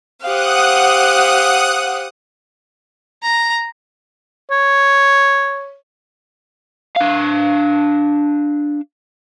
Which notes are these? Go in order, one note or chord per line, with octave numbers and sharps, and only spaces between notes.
G4 C5 F5 F#5 D#6 F#6
A#5
C#5
D4 F5